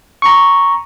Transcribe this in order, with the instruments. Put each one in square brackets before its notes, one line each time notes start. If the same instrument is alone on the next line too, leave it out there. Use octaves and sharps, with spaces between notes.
[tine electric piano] A#5 C#6